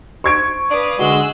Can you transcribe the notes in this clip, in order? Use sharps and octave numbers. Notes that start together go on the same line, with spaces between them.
C5 C#6 G#6 D7
B4 D5 F5 D#6
D3 G#3 F#4 G#5 E6 F#6